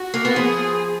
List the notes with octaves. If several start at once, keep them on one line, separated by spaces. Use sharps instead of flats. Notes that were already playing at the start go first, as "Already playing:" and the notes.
Already playing: F#4
A#3
B3
F3 G#4